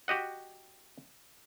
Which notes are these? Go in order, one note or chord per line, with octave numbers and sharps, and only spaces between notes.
F#4 G4 D#5 F#5